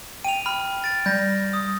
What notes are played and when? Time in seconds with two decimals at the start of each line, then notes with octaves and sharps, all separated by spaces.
0.24 G5 D#7 F7
0.46 B5 F6
0.84 A6 D7
1.06 G3 G6 A#6
1.53 D#6